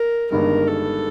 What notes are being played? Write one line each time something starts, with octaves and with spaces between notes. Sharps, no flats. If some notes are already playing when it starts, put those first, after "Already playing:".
Already playing: A#4
G1 G2 D#3 G#3 A#4
A4